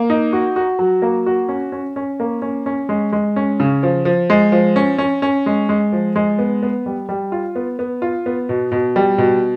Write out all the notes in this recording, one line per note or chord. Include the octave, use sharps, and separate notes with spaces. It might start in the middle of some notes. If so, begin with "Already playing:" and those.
Already playing: A#3
D#4
F#4
F#4
F#3
A#3
F#4
C#4
C#4
C#4
A#3
C#4
C#4
G#3
G#3
C#4
C#3
F3
F3
G#3
F3
C#4
C#4
C#4
G#3
G#3
F3
G#3
B3
B3
G3
G3
F4
B3
B3
F4
B3
B2
B2
G3
B2